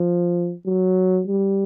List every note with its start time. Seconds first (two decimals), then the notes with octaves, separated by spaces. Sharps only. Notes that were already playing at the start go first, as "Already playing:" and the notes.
Already playing: F3
0.67 F#3
1.27 G3